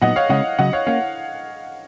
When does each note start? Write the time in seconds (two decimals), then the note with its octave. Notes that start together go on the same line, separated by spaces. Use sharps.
0.01 A#2 F#3 B3 D#4 D#5 F#5
0.16 C#5 F5
0.29 C#3 G#3 C#4 D#5 F#5
0.59 C#3 F#3 C#4 D#5 F#5
0.73 C#5 F5
0.86 A#3 C#4 C#5 F5